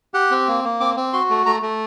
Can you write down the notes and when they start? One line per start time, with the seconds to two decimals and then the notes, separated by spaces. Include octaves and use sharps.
0.14 G4 F#5
0.31 C4
0.48 A#3
0.64 A#3
0.80 C4 D6
0.97 C4
1.13 F#4 C6
1.30 A3
1.46 A3 A#5
1.62 A3